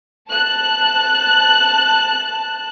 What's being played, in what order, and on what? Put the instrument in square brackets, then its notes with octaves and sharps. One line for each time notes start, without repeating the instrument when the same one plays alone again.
[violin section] A5 F#6